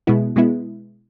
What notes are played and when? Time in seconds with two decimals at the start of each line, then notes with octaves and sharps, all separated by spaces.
0.07 B2 G#3 B3 E4
0.36 B2 G#3 B3 E4